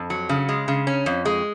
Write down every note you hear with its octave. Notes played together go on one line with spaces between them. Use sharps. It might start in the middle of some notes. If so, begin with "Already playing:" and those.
Already playing: F2
F#3
C#3
G#3
C#3
C#4
F2
G#3